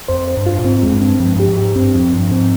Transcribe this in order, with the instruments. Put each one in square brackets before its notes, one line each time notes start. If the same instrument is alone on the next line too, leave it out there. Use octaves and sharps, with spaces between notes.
[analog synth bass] F2 [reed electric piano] C5
[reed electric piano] C5
[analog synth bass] G2
[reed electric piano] F4
[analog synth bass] A#2
[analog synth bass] G#2 [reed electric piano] C4
[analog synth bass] F2 [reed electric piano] G#3
[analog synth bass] G2
[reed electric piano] C4
[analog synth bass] G2 [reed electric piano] F3
[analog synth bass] G2 [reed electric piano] G4
[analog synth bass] G#2
[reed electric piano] G4
[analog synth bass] G2 [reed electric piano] C4
[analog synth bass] F2 [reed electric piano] F3
[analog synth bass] G2 [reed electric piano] F3
[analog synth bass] G#2 [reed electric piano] C4